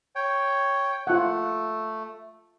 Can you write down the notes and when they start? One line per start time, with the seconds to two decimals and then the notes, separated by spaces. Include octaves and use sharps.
0.15 C#5 G5
1.07 A3 F4 F#5